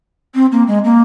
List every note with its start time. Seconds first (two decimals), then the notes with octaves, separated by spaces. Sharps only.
0.34 C4
0.52 A#3
0.67 G#3
0.84 A#3